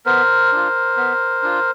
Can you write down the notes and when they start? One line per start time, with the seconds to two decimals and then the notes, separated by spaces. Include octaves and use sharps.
0.06 B3 A#4 C5
0.52 D4 F4
0.97 B3
1.43 D4 F4